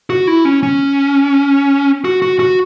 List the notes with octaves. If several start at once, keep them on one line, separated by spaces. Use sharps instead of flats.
F#4
E4
C#4
C#4
F#4
F#4
F#4